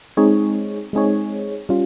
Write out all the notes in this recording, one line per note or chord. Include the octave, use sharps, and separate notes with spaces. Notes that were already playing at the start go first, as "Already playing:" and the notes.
G#3 C4 D#4 G#4 C#5
G#3 C4 D#4 G#4 C#5
G3 C#4 F4